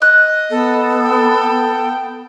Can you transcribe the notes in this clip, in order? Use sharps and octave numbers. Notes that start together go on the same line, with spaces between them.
D#5 F#6
B3 A4
G5